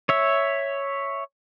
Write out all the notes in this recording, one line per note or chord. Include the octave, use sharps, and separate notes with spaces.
C#5 E5